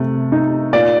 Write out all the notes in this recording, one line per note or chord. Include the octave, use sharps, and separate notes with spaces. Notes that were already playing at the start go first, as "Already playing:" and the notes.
Already playing: C3 A3
D#4
A#2 D5